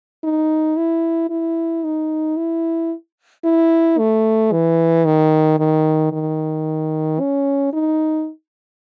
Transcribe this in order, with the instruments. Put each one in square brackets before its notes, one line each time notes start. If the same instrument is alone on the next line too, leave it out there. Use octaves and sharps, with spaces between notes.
[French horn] D#4
E4
E4
D#4
E4
E4
A3
E3
D#3
D#3
D#3
C#4
D#4